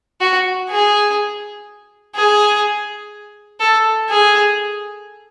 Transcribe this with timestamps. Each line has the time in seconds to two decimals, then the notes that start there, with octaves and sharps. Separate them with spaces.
0.21 F#4
0.70 G#4
2.15 G#4
3.60 A4
4.09 G#4